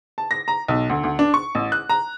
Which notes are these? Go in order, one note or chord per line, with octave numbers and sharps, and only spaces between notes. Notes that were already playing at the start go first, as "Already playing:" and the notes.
A5
A#6
A#5
B1
D2
D2
D4
C#6
A1
F#6
A#5